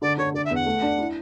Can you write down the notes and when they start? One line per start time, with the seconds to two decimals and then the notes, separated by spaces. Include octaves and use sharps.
0.02 D3 D5
0.18 D3 C#5
0.34 D3 D5
0.45 E5
0.50 E2 F#5
0.66 A3
0.82 D4
0.98 E4